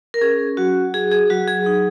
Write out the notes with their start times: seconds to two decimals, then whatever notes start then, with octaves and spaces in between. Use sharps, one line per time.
0.14 A#4
0.21 C#4 G#4
0.57 F#3 F#4
0.94 F#4 G#4
1.11 G#4
1.30 F#3 F#4
1.48 G#4
1.66 D#4